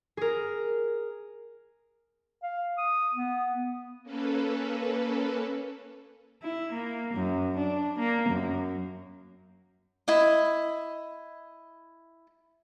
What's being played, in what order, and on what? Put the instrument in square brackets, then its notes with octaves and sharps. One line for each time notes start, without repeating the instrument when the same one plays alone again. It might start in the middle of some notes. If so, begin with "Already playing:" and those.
[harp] G#4 A#4
[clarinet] F5
D#6
B3
[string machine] A#3 C#4 A4 B4
[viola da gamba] E4
A#3
F#2
D4
A#3
F#2
[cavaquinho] E4 D#5